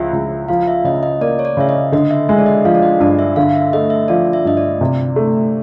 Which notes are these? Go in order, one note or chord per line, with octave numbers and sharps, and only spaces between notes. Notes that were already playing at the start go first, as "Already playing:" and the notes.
Already playing: C#2 F3 E5
C#2
F3 F5
E5
C#3 D#5
D#5
A#3 D5
C#5
D5
C#3 E5
D#5
D3 D#5
E5
G#3 E5
D5
D#5
F3 F5
D5
D#5
G2 D5
E5
D3 F5
E5
A3 D#5
E5
F3 D5
E5
G2 D#5
D5
C3
A3